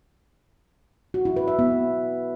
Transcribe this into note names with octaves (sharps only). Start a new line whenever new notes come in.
F#4
E4
B4
E5
B3